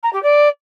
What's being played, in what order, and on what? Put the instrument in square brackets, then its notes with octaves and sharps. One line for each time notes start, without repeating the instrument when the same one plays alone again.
[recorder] A#5
G4
D5